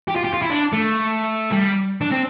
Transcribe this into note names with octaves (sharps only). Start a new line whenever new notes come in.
G4
F4
G4
F4
E4
D4
A3
G3
D4
C4